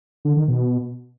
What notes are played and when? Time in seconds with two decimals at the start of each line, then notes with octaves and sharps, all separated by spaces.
0.25 D3
0.36 D#3
0.48 B2